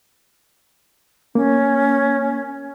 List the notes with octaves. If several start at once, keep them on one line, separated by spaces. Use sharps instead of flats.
A#3 C#4